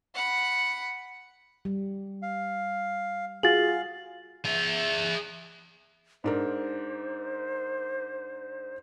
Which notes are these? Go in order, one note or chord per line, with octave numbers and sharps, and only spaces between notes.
F#5 B5
G3
F5
F4 F#4 G#4 F5 A6 F#7
G#4 E5
G#2 D4 A#4 C5